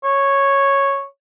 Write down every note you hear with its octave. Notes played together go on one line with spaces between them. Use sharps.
C#5